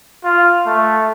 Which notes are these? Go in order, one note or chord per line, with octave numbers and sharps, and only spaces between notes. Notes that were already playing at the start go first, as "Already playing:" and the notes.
F4
A3